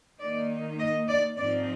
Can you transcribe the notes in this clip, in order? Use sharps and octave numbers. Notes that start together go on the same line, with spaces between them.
D#3 A#3 D#4 D5
D#5
D5
G#2 F3 C4 D#4 D5